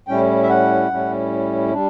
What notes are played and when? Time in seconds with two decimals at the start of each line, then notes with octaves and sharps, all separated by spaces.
0.08 A2 G3 C#4 E4 G5
0.43 E5
0.49 F#5
0.91 A2 G3 C#4 E4
1.73 G3 D4